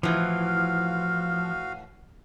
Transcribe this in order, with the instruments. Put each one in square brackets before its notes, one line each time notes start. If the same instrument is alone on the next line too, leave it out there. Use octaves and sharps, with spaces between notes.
[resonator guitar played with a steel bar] A2 E3 [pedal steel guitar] F3 [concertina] F#4 F5 [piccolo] F6